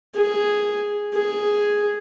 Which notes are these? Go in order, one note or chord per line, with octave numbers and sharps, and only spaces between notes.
G#4
G#4